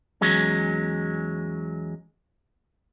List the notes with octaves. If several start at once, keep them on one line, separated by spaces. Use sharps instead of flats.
E2 F#3 G#3 C#4